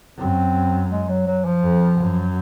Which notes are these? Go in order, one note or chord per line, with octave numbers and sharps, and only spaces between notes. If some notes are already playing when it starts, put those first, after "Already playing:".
F#2 C4
G#3
F#3
F#3
F3
F2
F#2